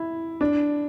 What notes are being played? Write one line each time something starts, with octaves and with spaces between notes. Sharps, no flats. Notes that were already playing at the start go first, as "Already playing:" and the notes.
Already playing: E4
D4